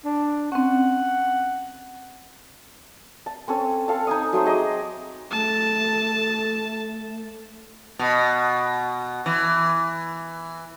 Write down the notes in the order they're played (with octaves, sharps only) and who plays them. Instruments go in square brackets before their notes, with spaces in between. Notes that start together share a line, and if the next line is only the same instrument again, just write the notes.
[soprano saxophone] D4
[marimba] C4 C#4 [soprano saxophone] F#5
[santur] A5
C4 C#4 A4
A4 F5 A5
D#4 G#5 D#6
F#3 A3 D#4 C5
G#4 D#5 D6
[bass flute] A3 [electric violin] A5
[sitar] B2
E3